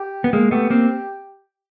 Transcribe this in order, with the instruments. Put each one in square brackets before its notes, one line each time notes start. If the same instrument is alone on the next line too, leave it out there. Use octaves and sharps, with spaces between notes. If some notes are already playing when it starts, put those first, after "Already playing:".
Already playing: [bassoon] G4
[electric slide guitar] B3
G#3 A#3
[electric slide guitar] A3 B3 [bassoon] G4
[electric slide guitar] A#3 C4